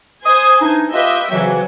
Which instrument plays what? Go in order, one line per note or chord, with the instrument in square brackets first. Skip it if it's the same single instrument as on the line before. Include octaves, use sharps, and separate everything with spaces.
[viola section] C5 G#5 [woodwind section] D#6
[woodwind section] E3 D4 D#4
[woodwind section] F4 G4 B4 [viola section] D#5 E5 G5
[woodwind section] F2 C#3 E3 [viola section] F#3